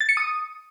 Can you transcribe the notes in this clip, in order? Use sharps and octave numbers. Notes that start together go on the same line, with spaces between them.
A6
C#7
D#6